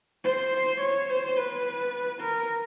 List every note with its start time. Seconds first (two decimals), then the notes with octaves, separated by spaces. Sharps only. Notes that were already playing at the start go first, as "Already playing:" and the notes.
0.24 C5
0.81 C#5
1.09 C5
1.37 B4
2.21 A#4